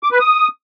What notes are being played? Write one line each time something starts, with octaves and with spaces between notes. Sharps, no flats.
D6
B4
D#6